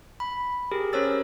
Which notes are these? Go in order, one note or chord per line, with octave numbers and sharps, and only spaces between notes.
B5
G4 G#4 A#4
C#4 A#4 C5 C#5 E6 A6